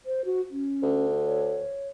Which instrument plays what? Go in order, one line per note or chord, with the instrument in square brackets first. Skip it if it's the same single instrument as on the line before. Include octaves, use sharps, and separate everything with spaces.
[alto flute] C5
F#4
C#4
[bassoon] D2
[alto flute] C#5